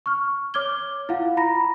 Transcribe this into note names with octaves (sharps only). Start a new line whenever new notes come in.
C#6 F6
C#5 D6 F6 G#6 G7
E4 F4 F5 F#5
A#5 B5 A#6